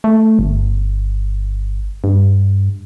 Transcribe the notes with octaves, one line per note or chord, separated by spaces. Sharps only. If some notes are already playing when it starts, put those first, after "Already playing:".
A3
G1
G2